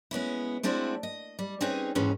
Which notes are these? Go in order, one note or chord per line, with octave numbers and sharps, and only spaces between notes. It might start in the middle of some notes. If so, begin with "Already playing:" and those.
G#3 B3 C#4 E4
G#3 A3 C4 D4 E4 F#4
D#5
G3
C4 C#4 D#4 G#4 B4 C#5
D#2 G#2 E3 G#3 C#4 B4